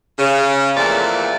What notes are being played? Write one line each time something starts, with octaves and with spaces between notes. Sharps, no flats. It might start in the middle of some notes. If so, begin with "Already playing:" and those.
C#3
E2 A#2 F3 A3 D5